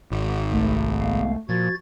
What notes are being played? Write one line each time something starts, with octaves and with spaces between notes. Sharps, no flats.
G#1
C2 A3
G#3 B3 F5
A#2 F3 F#4 G#6 A6